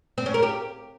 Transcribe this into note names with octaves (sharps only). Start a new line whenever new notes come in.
C4
C#4
A#4
G4